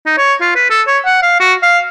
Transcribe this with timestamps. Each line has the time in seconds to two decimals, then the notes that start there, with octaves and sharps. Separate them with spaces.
0.06 D#4
0.18 C#5
0.41 F4
0.56 B4
0.70 A4
0.88 C#5
1.05 F#5
1.23 F5
1.40 F#4
1.63 F5